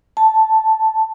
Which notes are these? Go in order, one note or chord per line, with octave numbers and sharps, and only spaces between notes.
A5